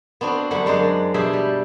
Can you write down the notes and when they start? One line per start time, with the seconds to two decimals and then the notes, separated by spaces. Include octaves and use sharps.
0.21 B3 C4 D4 F#4
0.51 F#2 D3 G3 A3 F#4 F#5
0.66 F#2 G#3 D4 C5 D#5
1.14 B2 D4 G4 G#4 E5 G5
1.33 G3